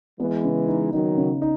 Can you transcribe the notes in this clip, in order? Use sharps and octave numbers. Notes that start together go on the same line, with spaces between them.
E3 G#3 B3
C#3
D#4
D#3 F#3 D#4
C#3
D#4